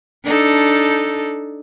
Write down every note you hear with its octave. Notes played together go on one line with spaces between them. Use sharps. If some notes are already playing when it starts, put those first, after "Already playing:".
D4 D#4 A4